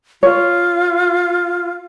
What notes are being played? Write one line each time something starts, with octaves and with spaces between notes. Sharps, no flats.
F4 C#5